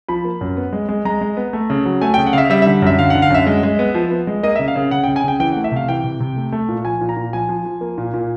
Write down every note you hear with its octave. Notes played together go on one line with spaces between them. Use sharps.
F3 B5
A#3
F#2
B3
G#3
G#3
G#3 A#5
G#3
B3
A3
C#3
F#3
A3 G#5
G5
C#3
F#5
C#3 E5 F5
G3 E5
E5
D3
F#2 E5
D3 F5
F#5
D3
F5
F#2 E5
G#3
G#3
B3
F3
B3
G#3
A#3 D#5
E5
C#3
F5
C#3
C#3 F#5
G5
C#3
G#5
C#3 G5
E3 G5
F#5
A3
E5
C3 F5
E3 G5
C3
C3
A3
A3
A#2
F3 G#5
A#2
A#5
A#2
F3 G#5
F3
F3
A#3
A#2
A#2